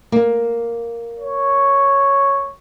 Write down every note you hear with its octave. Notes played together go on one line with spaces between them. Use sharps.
A#3
C#5